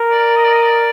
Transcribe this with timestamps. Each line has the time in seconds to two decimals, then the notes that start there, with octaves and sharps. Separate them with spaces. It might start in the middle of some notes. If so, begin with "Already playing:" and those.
Already playing: A#4
0.11 D5
0.36 D#5
0.44 D5
0.53 D#5
0.62 D5